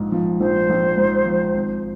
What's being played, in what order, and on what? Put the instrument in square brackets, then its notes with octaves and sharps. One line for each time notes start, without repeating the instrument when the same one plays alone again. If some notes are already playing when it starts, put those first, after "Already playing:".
Already playing: [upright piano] A#1 G#2 F3
F3
[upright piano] A#1 [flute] C5
[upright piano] A#1
G#2
F3
G#1